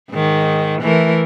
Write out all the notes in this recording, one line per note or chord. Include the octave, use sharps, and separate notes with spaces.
G#2 D#3
E3 A3 A#4